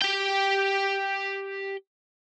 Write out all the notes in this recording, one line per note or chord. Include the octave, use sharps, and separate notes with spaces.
G4 G5